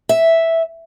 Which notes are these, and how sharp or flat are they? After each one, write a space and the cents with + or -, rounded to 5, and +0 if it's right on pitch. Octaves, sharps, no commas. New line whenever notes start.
E5 -5